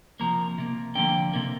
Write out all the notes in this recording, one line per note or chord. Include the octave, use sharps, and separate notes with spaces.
C3 F3 A#3 A#5
C3 A#3
D3 F3 A#3 G5
C3 A#3